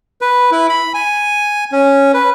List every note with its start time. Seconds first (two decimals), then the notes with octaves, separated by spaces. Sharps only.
0.21 B4
0.52 E4
0.70 B5
0.94 G#5
1.72 C#4
2.14 B4